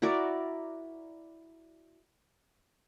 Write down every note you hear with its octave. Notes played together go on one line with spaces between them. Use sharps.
E4 F#4 A#4 D5